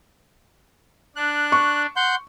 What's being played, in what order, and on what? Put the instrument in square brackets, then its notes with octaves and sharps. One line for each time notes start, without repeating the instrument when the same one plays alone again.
[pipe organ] D4 [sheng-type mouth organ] F#6
[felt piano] C#6
[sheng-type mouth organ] F#5 C6 G6